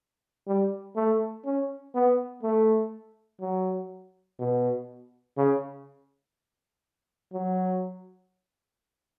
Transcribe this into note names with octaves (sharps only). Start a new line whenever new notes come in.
G3
A3
C#4
B3
A3
F#3
B2
C#3
F#3